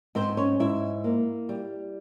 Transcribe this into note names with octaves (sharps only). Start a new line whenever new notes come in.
G#2 C4 C5
C#4 C#5
G#2 E4 E5
A#3
G3